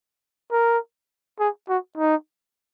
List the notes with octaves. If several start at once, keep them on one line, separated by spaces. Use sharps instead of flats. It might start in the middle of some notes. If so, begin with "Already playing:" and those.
A#4
G#4
F#4
D#4